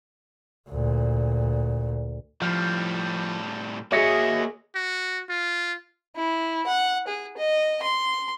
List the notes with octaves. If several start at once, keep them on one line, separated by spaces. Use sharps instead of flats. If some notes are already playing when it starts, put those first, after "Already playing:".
D2 A#2
A2 F3 G3
A#3 F#4 G#4 C#5 D#5 E5
F#4
F4
E4
F#5
G#4
D#5
C6